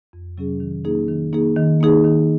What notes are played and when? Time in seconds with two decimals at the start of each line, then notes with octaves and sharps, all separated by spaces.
0.13 F2
0.37 C3 F#3 C#4 G#4
0.60 D#3
0.85 A#3 D#4 G#4
1.08 D#3
1.33 A#3 D#4 G#4
1.56 D#3
1.81 A#3 D#4 G#4
2.05 D#3